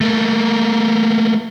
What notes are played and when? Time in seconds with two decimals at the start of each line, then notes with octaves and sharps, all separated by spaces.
0.01 A3 A#3